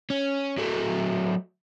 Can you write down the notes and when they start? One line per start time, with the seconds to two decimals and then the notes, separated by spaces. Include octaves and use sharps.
0.10 C#4
0.58 F#3 A3